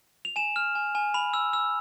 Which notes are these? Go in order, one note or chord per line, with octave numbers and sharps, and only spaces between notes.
F7
G#5 E7
F6
G#5
G#5
B5 F7
E6
E6